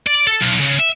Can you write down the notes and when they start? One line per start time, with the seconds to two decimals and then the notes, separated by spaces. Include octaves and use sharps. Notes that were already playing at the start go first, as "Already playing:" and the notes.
0.07 D5
0.27 A4
0.41 B1
0.61 C#3
0.79 E5